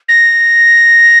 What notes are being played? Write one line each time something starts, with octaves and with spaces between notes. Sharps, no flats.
A#6